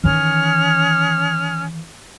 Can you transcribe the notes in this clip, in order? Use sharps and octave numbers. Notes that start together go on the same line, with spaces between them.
D#3 E3 C#4 D#6 F6